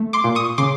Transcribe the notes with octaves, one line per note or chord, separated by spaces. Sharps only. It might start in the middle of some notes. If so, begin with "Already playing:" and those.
Already playing: A3
C6 D6
A#2
C#6 D#6
C#3 C6 D6